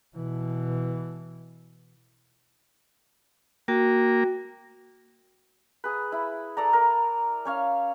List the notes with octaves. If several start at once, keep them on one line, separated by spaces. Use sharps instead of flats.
B2 E3
A#3 F#4 G5
G#4 B4
E4
A4 D5 A#5
A#4
C#4 C#5 F5